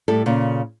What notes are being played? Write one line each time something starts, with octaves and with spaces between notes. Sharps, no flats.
A2 G3 A4
A#2 C#3